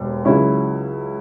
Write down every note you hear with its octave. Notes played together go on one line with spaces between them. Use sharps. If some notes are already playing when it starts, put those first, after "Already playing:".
Already playing: E1 D#2
C#2 C#3 F#3 C#4 E4